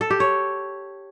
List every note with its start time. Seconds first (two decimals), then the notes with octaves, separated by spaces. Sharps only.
0.01 A4
0.10 G4
0.20 C#5